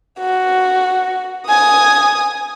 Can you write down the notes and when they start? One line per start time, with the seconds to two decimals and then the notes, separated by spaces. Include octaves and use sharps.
0.19 F#4
1.48 G#5 D#6